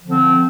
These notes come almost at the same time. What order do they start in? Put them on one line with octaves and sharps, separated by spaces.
F3 D3 C4